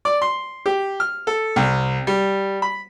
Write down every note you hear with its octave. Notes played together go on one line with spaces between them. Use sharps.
D5
C6
G4
F6
A4
C2
G3
B5